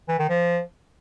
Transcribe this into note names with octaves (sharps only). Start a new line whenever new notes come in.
E3
D#3
F3